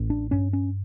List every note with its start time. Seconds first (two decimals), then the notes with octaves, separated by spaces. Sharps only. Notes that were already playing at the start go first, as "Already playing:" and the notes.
Already playing: A1
0.10 D4
0.31 G2 C#4
0.53 C#4